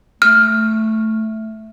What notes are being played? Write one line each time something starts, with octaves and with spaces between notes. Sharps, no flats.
A3 F6